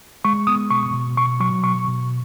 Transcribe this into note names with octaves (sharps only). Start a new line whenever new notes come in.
G#3 C#6
B3 D#6
B2 C#6
B2
B2 C#6
F#3 C#6
B2 C#6
B2